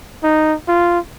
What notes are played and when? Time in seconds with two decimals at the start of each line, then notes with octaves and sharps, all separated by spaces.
0.23 D#4
0.68 F4